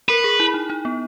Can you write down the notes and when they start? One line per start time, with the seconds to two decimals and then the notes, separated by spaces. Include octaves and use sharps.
0.09 A#4 B4
0.24 G#4
0.40 E4
0.54 D#4
0.70 D#4
0.85 B3